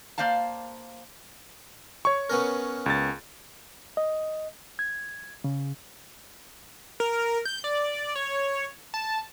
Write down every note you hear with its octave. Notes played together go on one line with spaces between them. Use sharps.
A#3 C5 D5 F5 A5
C#5 C#6
B3 C#4 A#4
C#2 A6
D#5
G#6
C#3
A#4
G6
D5
C#5
A5